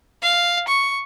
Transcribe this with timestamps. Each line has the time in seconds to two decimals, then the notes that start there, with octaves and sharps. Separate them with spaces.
0.22 F5
0.68 C#6